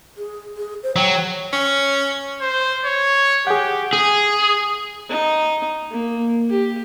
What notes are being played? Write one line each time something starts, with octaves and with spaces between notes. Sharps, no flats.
G#4
G#4
C5
F#3 G5
C#4
C5
C#5
G4 G#4 F#5
G#4
D#4
A#3
G4